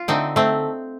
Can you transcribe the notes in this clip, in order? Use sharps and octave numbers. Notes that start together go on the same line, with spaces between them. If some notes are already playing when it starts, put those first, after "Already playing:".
Already playing: F4
D3 A3 C4 D#4
A3 C4